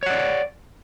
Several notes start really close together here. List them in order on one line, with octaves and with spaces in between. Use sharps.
C#5 F#5 D5